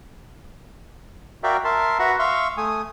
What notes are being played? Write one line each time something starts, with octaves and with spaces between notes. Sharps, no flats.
F#4 A#4 D5 E5 F5 G5
A#4 E5 A5 C6
F#4 B4 E5 F#5 A#5 B5
E5 F5 C6 C#6
A3 G#5 D#6